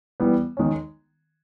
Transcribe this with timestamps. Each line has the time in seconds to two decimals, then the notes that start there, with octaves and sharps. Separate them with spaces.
0.20 E3 G3 B3
0.57 D#3 G#3 C#4